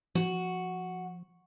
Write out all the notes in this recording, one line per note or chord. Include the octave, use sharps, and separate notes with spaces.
F3 F#4